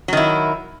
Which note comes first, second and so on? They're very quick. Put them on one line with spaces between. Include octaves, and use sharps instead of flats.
F#3 D#3 E4